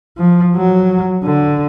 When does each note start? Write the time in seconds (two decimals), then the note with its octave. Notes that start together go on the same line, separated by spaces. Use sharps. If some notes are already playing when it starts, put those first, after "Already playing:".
0.18 F3
0.56 F#3
1.23 D3